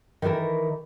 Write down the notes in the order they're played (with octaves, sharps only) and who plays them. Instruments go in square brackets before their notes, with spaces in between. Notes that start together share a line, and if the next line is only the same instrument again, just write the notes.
[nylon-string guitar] D#3 E3 E4 A4 A#4